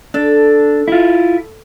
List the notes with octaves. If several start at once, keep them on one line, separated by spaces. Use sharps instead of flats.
D4 A4
E4 F4